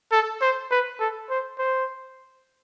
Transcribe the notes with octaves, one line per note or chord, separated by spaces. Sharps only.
A4
C5
B4
A4
C5
C5